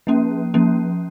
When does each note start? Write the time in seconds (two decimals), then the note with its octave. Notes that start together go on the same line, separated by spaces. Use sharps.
0.07 F3 A#3 C#4
0.54 F3 A#3 C#4